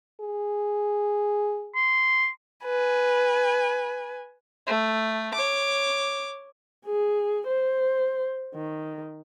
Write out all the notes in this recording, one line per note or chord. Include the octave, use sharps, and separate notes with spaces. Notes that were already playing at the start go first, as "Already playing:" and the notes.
G#4
C6
B4 G#5
A3
C#5 D6
G#4
C5
D#3